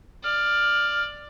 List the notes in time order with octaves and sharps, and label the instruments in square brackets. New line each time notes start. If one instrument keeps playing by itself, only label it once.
[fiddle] D5 [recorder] F6